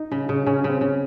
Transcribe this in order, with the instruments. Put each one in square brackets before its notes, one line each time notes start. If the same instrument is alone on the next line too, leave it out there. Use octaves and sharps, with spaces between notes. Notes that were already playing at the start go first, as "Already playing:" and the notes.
Already playing: [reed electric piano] D#4
[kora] C#3
C#3
[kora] C#3 [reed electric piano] C#4
[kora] C#3
[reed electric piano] C4
[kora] C#3